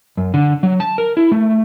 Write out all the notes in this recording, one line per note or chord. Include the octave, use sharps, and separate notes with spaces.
F#2
D3
F#3
A5
A#4
E4
A3